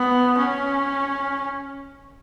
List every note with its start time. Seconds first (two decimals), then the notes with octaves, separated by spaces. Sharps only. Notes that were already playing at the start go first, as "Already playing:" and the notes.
Already playing: B3
0.38 C#4